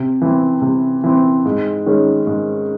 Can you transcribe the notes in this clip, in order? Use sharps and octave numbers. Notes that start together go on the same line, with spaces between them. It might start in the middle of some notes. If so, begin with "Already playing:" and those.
Already playing: C3
E3 C4
C3
E3 C4
G#2
D#3 G#3 C#4
G#2